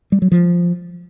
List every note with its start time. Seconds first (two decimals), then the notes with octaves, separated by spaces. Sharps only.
0.12 G3
0.22 F#3
0.32 F3